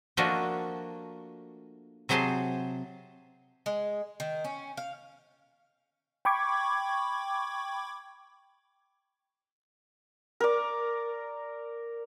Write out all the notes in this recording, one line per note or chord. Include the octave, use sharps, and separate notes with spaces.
F3 A3 A#3 D4 F#4 D#5
C3 F#3 G#4 C5 A5 C6
G#3
D#3
C#4
F5
G5 B5 C#6 D6 G#6
A#4 D5